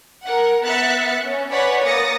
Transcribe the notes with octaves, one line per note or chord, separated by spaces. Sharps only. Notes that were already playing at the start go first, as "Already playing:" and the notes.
A#4 F#5
B3 E5 F#6 A6 C#7
C#4
B4 C#5 D5 F#5 G#5 B5
A#3 D#6 A6 A#6 C#7